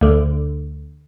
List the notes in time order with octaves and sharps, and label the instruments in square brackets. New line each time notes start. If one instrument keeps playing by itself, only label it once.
[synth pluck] D2 D3